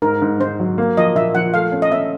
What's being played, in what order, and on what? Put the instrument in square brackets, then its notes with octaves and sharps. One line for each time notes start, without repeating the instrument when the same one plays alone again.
[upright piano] G#2 [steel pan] A#4
[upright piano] G#2
[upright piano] G#2 [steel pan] C5
[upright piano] F#3
A#3
[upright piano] F3 [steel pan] D#5
[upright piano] A#2 [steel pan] E5
[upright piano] F3 [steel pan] F#5
[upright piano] A3 [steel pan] F5
[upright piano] C#4
[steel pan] D#5
[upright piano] C#4 [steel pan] E5